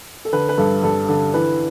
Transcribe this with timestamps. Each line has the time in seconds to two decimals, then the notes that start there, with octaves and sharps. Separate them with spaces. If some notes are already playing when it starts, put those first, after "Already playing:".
0.25 A4
0.33 D3 B4
0.49 B4
0.58 G2 A4
0.83 G2 A4
1.08 D3
1.34 E3 B4